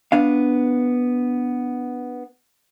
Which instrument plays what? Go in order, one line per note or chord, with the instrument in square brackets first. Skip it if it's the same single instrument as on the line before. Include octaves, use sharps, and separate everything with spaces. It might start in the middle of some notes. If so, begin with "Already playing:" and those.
[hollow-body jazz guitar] B3 D4 F5